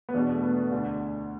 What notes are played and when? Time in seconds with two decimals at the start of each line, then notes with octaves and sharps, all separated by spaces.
0.09 B3
0.14 E2 B2 D4
0.35 A3
0.43 B3
0.71 D2 D3 D4